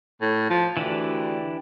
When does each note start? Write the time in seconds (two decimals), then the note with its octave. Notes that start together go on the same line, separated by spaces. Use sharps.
0.22 A2
0.50 F3
0.77 D2 E3 D4 G4